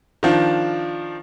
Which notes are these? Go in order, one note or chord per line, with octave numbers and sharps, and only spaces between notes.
D#3 F3 D4